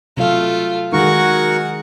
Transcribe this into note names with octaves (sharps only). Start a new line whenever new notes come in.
C3 F#3 A3 F4 F5
D#3 G#3 D#4 F#4 G#4 A#4 F#5 C#6